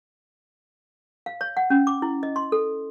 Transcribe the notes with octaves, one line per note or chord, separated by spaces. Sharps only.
F5
C#5
F#5
C#4
D6
E4
D#5
C6
A4